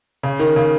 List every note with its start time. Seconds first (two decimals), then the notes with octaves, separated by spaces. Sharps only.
0.23 C#3
0.39 D#3
0.56 C#3